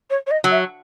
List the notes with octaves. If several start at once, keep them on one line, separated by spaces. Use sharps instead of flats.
C#5
C#5
D#5
F#3
E5